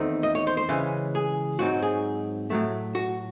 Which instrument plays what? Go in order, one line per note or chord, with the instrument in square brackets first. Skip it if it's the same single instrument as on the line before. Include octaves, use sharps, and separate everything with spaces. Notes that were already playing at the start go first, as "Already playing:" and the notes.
Already playing: [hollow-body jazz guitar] E2 D#3 A3 C4 D#4 C5
D#5
C#5
C5
C5
C#3 E3 G#3 C#4
G#4
G#2 F#3 C4 D#4 F#4
G#4
A2 F#3 A3
F#4